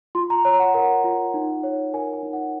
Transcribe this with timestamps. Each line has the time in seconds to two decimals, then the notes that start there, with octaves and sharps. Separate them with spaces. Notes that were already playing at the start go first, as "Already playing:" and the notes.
0.15 F4 C6
0.30 A#5
0.45 C#5 A#5
0.60 F#5
0.74 A#4 F#5
1.04 F4
1.34 D#4
1.63 C#5
1.94 A#4 G#5
2.13 G#5
2.23 D#4
2.33 F#5